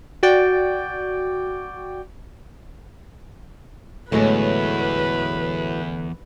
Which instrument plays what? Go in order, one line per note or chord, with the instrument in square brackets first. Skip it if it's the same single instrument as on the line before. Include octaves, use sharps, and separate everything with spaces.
[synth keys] F#4 D5 G5
[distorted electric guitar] E2 [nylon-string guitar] A2 F#3 G#3 [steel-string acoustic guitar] D3 A3 B3 [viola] B4